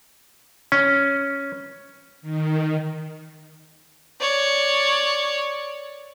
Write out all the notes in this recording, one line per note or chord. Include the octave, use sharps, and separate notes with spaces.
C#4
D#3
C#5 D5